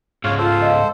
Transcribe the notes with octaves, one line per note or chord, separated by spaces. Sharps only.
C#2 G#2 F4 C#5 F5
F4 A4 C5
D#5 F5